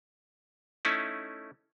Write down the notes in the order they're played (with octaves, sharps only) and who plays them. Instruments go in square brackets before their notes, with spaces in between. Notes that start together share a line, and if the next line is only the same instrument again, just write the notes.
[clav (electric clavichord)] A3 C#4 D#4 E4